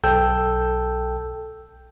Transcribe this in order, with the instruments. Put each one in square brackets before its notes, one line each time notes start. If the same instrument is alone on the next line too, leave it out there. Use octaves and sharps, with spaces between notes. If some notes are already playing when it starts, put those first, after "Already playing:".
[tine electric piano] B1 A4 G5 A5 E6 G6